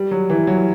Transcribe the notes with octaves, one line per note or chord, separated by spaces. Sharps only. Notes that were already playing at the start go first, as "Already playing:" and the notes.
Already playing: G3
F#3
E3
F#3